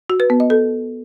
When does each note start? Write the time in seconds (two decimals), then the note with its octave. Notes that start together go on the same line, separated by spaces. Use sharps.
0.10 F#4
0.20 B4
0.30 B3
0.40 D#5
0.50 A4